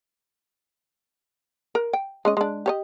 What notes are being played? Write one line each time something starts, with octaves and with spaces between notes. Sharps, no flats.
A#4
G5
G#3 C#4 D#5
G#3 D4
G4 C#5 D#5